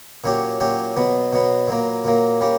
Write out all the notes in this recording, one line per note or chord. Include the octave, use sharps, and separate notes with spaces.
A#2 F#3 C#4 G4
A#2 F#3 C#4 G4
B2 F#3 B3
B2 F#3 B3
A#2 F#3 A#3
A#2 F#3 A#3
G3 A#3 C#4